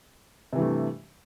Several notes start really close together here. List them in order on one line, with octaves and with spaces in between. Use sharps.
C3 E3 G2 A3